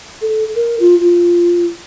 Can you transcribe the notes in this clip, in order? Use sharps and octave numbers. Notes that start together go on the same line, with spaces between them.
A4
A#4
F4
F4